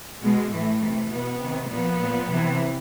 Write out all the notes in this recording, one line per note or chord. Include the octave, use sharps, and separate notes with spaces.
B2 G#3
A2 E3 A3
C3 E3
B2 B3
C3 D#3
A#2 F3 B3
A#2 F3
C3 E3